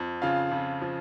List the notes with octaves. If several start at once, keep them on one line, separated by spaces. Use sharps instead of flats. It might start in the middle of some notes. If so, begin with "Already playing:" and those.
Already playing: F2
C#3 F4 F5
F2
F3